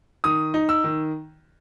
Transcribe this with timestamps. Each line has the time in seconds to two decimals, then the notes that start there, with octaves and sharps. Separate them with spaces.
0.24 D#3 D#6
0.54 D#4
0.69 E6
0.84 D#3